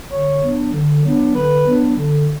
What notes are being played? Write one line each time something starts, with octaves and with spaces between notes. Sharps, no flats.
D3 C#5
F#3 B3 D4
D3
F#3 B3 D4
D3 B4
F#3 B3 D4
D3